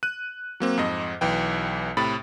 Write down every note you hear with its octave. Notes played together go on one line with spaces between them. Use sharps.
F#6 D#7
F#3 A#3 C4
F2 G#2 D#5
B1 E3 G5
A2 C3 B5 A6